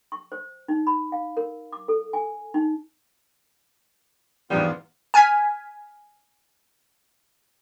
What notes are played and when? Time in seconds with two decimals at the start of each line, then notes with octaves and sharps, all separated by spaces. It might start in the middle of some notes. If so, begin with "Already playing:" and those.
0.12 C#6
0.32 C5
0.68 D#4
0.87 B5
1.12 F5
1.37 A#4
1.72 D6
1.88 A4
2.13 G#5
2.54 D#4
4.50 A#1 E2 G#2 G3 B3 F4
5.14 G#5 F6 G#6 B6